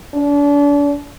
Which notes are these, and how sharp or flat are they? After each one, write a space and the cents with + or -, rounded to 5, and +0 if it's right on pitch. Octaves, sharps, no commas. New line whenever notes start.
D4 -35